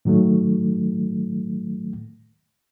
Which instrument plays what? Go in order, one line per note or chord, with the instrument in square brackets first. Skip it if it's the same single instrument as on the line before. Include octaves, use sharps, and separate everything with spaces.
[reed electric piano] A2 D#3 F#3 A3